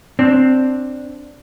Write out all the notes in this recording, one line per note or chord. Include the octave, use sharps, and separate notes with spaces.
C4 D4